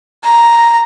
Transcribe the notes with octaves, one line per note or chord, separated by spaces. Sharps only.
A#5